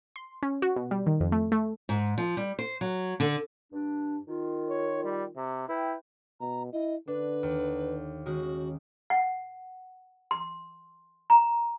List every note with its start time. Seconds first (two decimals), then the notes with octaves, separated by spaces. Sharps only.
0.16 C6
0.43 C#4
0.62 F#4
0.76 B2
0.91 G3
1.07 D#3
1.20 F2
1.32 A3
1.52 A3
1.89 G#2
2.18 F3
2.37 G3
2.59 C5
2.81 F#3
3.20 D3
3.73 G2 D4
4.27 D#3 F4
4.69 C#5
5.04 G3
5.37 C3
5.69 E4 B4 G5
6.40 B2 A#5
6.73 E4 D#5
7.08 D3 D4 B4
7.43 D#2
8.26 D#3 G#3 C#4 F#4
9.10 F#5
10.31 C6
11.30 A#5